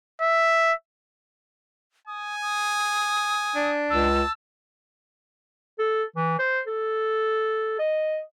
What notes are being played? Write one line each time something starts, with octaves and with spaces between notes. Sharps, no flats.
E5
G#5 D#6
D#6
D4
C#2 A5 E6
A4
E3
C5
A4
D#5